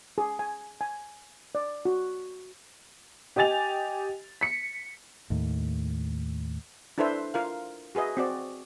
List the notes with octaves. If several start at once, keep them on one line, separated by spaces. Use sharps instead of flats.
G#4
G#5
G#5
D5
F#4
G4 D#5 G#5 A6 F7
B6 C#7
D#2 A2
D4 E4 A4 B4 C5 E5
F4 A#4 F5
F#4 G#4 B4 D#5 E5
C4 F#4 D5